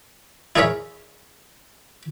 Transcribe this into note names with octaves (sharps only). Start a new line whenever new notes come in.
E4 G#4 A#4 C#5 E5